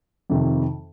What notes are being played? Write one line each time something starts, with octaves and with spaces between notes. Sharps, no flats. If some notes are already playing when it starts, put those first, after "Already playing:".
F2 C3 D#3